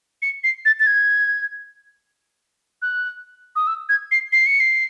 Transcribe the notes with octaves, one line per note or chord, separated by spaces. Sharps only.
C#7
C7
A6
A6
G#6
F#6
D#6
E6
G#6
C7
C7
C#7
C7